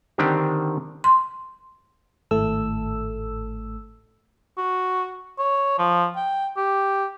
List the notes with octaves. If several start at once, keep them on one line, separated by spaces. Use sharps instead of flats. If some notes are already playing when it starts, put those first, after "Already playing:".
D3 D#3 C4 D4 G4
C6
G#1 A2 A3 A4 E6
F#4
C#5
F3
G5
G4